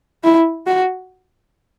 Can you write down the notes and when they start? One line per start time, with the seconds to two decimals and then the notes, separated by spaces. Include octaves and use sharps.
0.24 E4
0.66 F#4